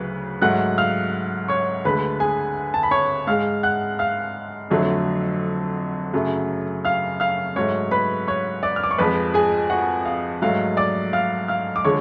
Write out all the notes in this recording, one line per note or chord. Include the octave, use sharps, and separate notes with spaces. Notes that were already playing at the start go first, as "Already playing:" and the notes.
Already playing: D2 C#3 F#3 B4
G#2 F#3 A3 F#5 F#6
F5 F6
C#5 C#6
D2 D3 G#3 B4 B5
G#4 G#5
A5
B5
C#5 C#6
G#2 G#3 F5 F6
F#5 F#6
F5 F6
F2 D3 F#3 A3
F#2 C#3 F#3 A3
F5 F6
F5 F6
G#2 F#3 A3 C#5 C#6
B4 B5
C#5 C#6
D5 D6
F6
D6
C#6
F2 F3 G#3 B4 B5
G#4 G#5
F#4 F#5
F5
G#2 F#3 A3 F5
D5 D6
F5 F6
F5 F6
D6
D3 F3 G#3 C#5 C#6